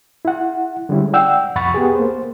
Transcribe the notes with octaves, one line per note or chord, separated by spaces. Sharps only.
E4 F#5
D3 G3 G#3 C#4 E4
D5 F#5 G5 E6
C2 F2 F#5 B5 C#6 A6
B3 G4 G#4
A#3 C5